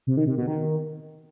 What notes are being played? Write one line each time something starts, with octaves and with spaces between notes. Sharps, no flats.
C3
D#3
C3
B2
D#3